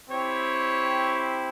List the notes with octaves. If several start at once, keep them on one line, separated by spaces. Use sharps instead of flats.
C4 E4 G4 C#5